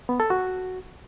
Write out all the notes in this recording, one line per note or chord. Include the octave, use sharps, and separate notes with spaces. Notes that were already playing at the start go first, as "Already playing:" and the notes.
B3
A4
F#4